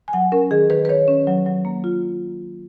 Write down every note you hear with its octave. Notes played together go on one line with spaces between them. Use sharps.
G#5
F#3 F#5
C#4 A#4
D#3 G#4
D#3 B4
B4
D#3 C#5
C#4
F#3
F#3
A#3
F4